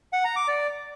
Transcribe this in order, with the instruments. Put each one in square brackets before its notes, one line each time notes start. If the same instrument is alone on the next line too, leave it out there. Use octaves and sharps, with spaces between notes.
[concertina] F#5
A#5
D6
D5